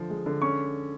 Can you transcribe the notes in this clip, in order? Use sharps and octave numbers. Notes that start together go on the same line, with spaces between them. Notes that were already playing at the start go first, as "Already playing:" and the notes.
Already playing: D3 F3
G#3
D3
C#4 C#6